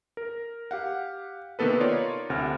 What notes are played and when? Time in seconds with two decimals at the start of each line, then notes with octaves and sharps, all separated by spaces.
0.17 A#4
0.71 G4 F5 F#5
1.59 C3 D#3 A#3 B3 A4 B4
1.80 D#4 F4 A#4 C#5 D5
2.30 D2 C3 F#5 F6